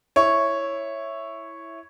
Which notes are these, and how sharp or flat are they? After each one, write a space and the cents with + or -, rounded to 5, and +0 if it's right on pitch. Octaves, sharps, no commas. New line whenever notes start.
E4 +0 C#5 -5